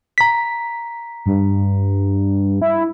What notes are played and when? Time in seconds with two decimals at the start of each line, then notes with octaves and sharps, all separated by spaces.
0.18 A#5 B6
1.26 G2
2.62 E4